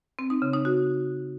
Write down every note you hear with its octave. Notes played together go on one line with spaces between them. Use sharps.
C4
D#4
C#3
D#4
F#4